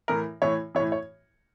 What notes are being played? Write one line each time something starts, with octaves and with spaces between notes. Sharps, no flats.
A2 E3 A#4
A2 E3 C#5
E3 C#5
A2
C#5